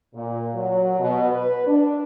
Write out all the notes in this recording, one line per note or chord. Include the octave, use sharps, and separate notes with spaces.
A#2
F#3
B2
B4
D4